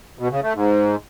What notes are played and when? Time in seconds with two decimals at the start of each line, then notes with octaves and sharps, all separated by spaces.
0.19 B2
0.31 C#3
0.43 A3
0.55 G#2